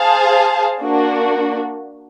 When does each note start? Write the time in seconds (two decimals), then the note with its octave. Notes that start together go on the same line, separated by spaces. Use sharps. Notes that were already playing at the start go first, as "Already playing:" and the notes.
Already playing: G#4 C5 F5 A5
0.80 A#3 D4 F#4